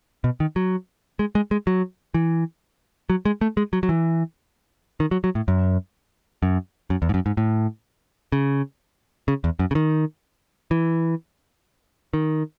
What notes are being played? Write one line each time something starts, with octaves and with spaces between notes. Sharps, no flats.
B2
D#3
F#3
G#3
G#3
G#3
F#3
E3
F#3
G#3
A3
G#3
F#3
F#3
E3
D#3
F#3
F#3
A2
F#2
F#2
F#2
E2
G#2
F#2
G#2
A2
C#3
C#3
E2
F#2
C#3
D#3
E3
D#3